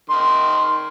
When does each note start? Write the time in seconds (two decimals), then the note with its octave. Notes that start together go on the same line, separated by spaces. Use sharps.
0.10 D#3 C6